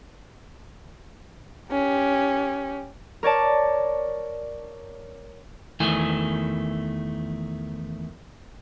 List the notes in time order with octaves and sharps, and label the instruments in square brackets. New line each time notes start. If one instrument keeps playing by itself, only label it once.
[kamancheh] C#4 G4
[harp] A#4 C#5 D5 A5
[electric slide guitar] E2 D#3 E3 A3 G#5